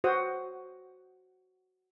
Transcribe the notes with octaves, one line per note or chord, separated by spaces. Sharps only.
F#4 C5 F#5 D#6